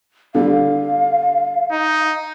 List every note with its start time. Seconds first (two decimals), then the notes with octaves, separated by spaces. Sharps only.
0.35 D3 G3 F5
1.72 D#4